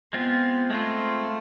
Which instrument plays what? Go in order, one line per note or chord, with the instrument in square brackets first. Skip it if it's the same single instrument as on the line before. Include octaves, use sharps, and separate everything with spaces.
[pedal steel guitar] G#3 C4 F4 [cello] B3
[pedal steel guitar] G#3 C4 F4 [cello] A3